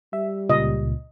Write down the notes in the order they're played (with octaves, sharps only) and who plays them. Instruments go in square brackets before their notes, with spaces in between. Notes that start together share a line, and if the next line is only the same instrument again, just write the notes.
[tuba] G3 [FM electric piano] E5
[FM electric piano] C#2 A#2 [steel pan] D#5